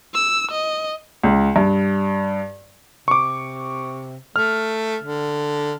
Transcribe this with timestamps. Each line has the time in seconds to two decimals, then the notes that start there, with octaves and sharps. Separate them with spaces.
0.14 E6
0.51 D#5
1.24 C#2
1.56 G2
3.08 C3 C#6 D6
4.36 A3 F6
5.03 D3